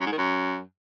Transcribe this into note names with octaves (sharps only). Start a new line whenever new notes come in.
F#2
G#2
D#3
F#2